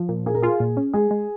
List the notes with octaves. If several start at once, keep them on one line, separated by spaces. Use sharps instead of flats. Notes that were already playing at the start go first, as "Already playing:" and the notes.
Already playing: F3
A#2
A#3 G#4
A#4
F4 G#4
A#2
C#4
G#3 G#4
G#3